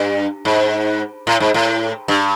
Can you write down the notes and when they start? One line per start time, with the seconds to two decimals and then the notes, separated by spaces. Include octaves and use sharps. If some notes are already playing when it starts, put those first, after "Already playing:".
Already playing: G2
0.45 G#2
1.27 A2
1.40 G#2
1.54 A2
2.08 G2